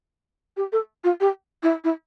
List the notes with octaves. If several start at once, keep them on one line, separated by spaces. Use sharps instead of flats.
G4
A4
F4
G4
E4
E4